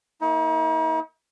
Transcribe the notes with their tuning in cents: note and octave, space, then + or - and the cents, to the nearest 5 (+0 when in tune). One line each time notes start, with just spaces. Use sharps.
A#3 -20 D#4 +45